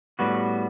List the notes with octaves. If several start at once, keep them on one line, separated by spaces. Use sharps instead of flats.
A2 G3 B3 F#4